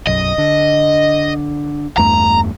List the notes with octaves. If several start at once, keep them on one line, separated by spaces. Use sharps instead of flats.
B1 F#2 D#5
D3
E2 G2 A3 A#5